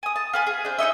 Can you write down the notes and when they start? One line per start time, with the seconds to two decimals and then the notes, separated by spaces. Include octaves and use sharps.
0.03 G#5 D#6
0.16 A5
0.33 F4 B4 G#5
0.47 G#4
0.65 D4 C5
0.78 D#4 C#5 D#5 E5